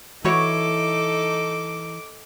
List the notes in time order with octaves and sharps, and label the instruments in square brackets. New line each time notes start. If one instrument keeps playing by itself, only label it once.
[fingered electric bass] E3 [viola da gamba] D#4 A4 [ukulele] E4 F#4 C#5 [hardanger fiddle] D6